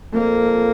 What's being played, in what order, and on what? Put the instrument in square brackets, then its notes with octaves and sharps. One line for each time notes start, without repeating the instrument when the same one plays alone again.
[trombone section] F2 [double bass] A#3